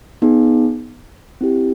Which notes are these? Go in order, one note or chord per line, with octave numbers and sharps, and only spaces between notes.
B3 D#4 G#4
C4 E4 G4